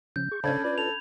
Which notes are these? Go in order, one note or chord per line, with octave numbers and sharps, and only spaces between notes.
C#3 F3 C#4 G6
G#4 C#6
C#3 C#4 D4 A4 C5 F5 B5 G#6
F4 B4 D5 B5
A4 F7